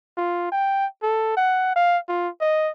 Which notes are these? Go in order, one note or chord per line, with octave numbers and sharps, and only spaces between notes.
F4
G5
A4
F#5
F5
F4
D#5